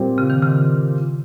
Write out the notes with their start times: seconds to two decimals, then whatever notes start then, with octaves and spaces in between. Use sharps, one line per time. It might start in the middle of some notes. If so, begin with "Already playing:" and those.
Already playing: A#2 G3 C4
0.18 C#3
0.30 D#3
0.42 C#3